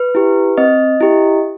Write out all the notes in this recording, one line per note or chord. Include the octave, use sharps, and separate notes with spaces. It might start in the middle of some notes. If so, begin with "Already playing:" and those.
Already playing: B4
E4 G4
C4 D#5
E4 G4